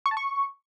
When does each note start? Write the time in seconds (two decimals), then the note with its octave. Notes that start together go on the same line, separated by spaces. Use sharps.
0.06 C#6
0.11 A5
0.17 C#6